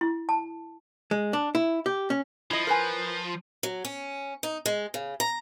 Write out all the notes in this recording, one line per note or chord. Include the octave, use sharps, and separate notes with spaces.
E4
A5
G#3
D4
E4
G4
C#4
F3 E4 D#5
A#4 B4 G#5
F#3
C#4
D#4
G#3
C#3
A#5